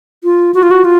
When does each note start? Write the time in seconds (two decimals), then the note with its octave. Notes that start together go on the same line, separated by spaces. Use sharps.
0.24 F4
0.54 F#4
0.63 F4
0.71 F#4
0.85 F4